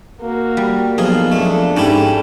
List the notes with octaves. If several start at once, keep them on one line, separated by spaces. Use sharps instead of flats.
A#3 F#4
G3
B1 F3 D#4 G#4 F5
F2 A3 D4 A4
G#2 C#4 E4 G4